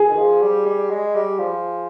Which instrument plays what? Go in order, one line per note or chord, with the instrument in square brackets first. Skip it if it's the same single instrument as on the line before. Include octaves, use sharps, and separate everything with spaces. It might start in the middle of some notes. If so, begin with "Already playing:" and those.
Already playing: [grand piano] G#4
[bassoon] D#3
F3
G3
G3
G#3
G3
F3